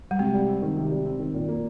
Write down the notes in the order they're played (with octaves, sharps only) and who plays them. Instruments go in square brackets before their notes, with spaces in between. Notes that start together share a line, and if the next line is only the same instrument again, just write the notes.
[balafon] G3
[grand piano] C3 [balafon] G#3
[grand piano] G3
C4
D#3
C3
G3
C4
D#3
A#2
A#3